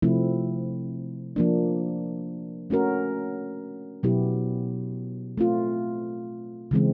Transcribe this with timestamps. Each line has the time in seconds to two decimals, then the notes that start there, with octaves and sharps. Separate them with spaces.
0.02 C3 F3 A3 C4 E4
1.36 F3 A#3 D4
2.70 A3 C#4 F#4 A#4
4.03 B2 F#3 B3 E4 G4
5.37 A3 C4 F4
6.71 C#3 E3 G#3 C4